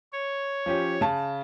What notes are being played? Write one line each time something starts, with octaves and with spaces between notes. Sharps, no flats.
C#5
F3 C#4 G4
C#3 A5